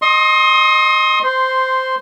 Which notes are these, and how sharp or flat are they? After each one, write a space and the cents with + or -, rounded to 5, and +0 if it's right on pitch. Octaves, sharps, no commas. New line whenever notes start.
D#5 -10 C6 +30 D#6 +30
C5 -10 C6 +0